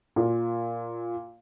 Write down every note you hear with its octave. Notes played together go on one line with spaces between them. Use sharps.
A#2